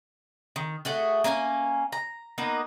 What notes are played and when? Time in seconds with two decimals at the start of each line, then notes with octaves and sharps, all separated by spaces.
0.56 D#3
0.85 A3 F#4 G#4
1.24 A#3 C#4 F#4 G#5
1.92 A#5
2.38 A#3 B3 D#4